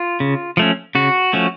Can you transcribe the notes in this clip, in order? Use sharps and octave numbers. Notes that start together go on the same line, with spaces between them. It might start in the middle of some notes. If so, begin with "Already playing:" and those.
Already playing: F4
C#3
F3 A3 C#4
C#3 F#4
F3 A3 C#4